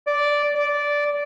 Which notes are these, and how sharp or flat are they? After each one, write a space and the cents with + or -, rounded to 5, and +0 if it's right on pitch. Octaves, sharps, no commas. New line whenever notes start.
D5 -5
D5 -10